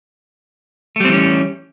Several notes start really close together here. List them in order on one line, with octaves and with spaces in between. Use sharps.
A3 G3 C4 E3 C#4